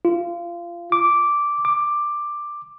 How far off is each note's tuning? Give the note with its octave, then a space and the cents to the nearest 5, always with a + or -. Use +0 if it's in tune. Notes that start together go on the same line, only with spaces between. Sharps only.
F4 -20
D6 -5
D6 +10